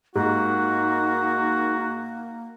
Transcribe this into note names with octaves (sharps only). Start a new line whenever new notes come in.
G#2 A#3 D#4 F#4